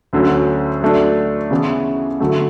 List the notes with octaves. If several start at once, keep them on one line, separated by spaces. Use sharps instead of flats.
D2 D3 F#3 C#4
F#3 A3 D4
C#3 E3 B3
D3 F#3 A3